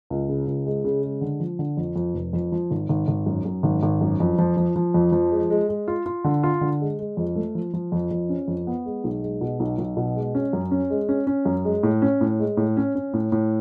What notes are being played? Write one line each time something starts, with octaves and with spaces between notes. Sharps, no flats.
C#2
C#3
C#2
G#3
C#3
G#3
D3
F3
D3
F2
F2
F1
F2
F3
G#1
G#1
G#1
F#2
F#2
G#1
G#1
F#2
F2
F3
F3
F3
F2
F3
G#3
G#3
G#3
F4
F4
D3
F4
D3
G#3
G#3
F2
A3
F3
F3
F2
F2
C#4
F2
B3
G#3
B1
G#3
B2
B1
B1
B2
G#3
C#4
F#2
C#4
G#3
C#4
C#4
F#2
G#3
A2
C#4
A2
G#3
A2
C#4
C#4
A2
A2